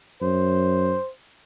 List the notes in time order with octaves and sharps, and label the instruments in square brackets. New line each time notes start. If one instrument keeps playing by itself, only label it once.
[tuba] F#2 [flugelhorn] C5